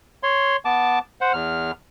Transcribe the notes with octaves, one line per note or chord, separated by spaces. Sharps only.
C#5 C6
B3 A5 D6
C5 F#5
E2 F6